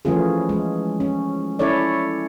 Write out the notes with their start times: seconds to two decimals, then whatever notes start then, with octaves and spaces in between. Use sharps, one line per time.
0.05 E3 F3 A3 C#4 F4 G#4
0.49 G#3
1.00 C#4
1.59 C#4 E4 A4 C#5 D5